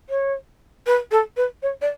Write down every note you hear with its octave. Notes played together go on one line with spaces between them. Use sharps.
C#5
B4
A4
B4
C#5
D5